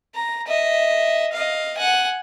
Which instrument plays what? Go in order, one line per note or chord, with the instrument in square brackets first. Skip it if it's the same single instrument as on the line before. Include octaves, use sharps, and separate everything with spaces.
[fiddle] A#5
D#5 E5
D#5 F5
F#5 G#5